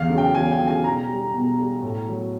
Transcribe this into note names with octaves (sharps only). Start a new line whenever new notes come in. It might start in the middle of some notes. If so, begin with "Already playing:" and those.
Already playing: E2 F5
C#3 F#3
G5
E2 G#5
G5
C#3 F#3
G#5
B2 A#5
G3
B2
G3
A2
F#3